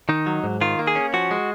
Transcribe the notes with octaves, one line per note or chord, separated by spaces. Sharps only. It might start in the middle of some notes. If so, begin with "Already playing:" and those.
D#3 D#4
F#3
G#2
D#3 F4
A#3
G#4
C#4
F3 F#4
G#3